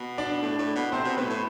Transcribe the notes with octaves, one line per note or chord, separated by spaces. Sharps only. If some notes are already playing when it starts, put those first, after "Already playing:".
Already playing: B2
D4 D5
A2
A2
B2
C3 C4 C5
B2
A2 B3 B4
A2